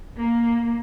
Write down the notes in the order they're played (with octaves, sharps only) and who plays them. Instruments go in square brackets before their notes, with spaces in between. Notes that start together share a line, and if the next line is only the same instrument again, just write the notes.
[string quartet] A#3